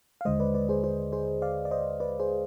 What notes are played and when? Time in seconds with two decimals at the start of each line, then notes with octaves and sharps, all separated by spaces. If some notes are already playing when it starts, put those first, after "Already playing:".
0.21 F5
0.25 D#2 D3 G#3 C5 D#5
0.39 B4 D5
0.54 B4 D5
0.69 G#4 C5
0.84 G#4 C5
1.12 G#4 C5
1.42 D5 F5
1.65 D5
1.71 C5 D#5
2.00 B4 D5
2.20 G#4 C5